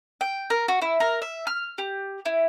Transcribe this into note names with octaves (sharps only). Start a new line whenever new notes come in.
G5
A#4
F#4
E4
A#4
E5
F6
G4
E4